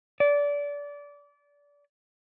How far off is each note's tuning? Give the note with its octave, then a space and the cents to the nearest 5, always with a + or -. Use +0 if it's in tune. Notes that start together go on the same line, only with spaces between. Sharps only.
D5 -25